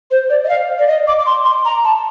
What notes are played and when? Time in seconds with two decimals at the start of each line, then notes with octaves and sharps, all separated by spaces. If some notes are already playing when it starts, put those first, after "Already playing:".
0.11 C5
0.30 D5
0.44 D#5
0.49 F5
0.79 D5
0.87 D#5
1.07 D6
1.19 D6
1.26 C6
1.45 C6
1.65 A#5
1.84 A5